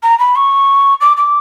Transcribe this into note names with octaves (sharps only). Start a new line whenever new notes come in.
A#5
B5
C#6
D6
D6